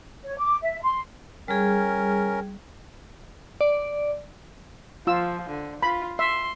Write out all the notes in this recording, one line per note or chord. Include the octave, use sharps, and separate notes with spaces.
C#5
D6
E5
C6
G3 C#4 G#4 A#4
D5
F3 F4 E6
D3
F4 B5
E5 C6